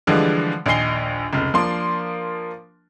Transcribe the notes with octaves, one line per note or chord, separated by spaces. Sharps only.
D3 E3 F3 G3 G#3
A#1 D#2 D#5 G#5 C7 G7
F1 C#2
F3 A#3 D4 C6